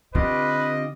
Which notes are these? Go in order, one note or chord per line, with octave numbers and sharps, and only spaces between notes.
D3 C4 F4 G4 B4 D#5